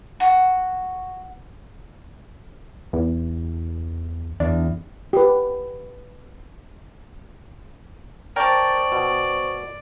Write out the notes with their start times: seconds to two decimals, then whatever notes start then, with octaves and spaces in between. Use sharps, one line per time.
0.20 F#4
2.93 E2
4.40 E2 D4
5.13 G4 B4
8.36 A#4 C5 D5 G5 A5 C#6
8.92 B2